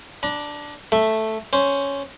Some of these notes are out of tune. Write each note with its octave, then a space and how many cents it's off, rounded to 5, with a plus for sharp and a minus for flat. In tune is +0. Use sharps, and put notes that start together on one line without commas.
D4 +0 A#5 +40
A3 +0 A4 +0 E5 +0
C#4 +5 C5 +0